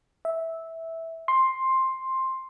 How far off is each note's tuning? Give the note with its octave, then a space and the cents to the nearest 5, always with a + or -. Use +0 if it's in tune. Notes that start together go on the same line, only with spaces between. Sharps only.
E5 -10
C6 +10